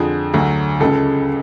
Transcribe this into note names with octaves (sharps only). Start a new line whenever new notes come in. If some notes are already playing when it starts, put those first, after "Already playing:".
Already playing: F2 D3 F3 G#4
D2 D3 F#3
C#2 C#3 G#3 A4